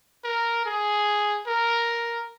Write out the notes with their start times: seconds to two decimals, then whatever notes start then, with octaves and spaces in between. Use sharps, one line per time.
0.24 A#4
0.65 G#4
1.47 A#4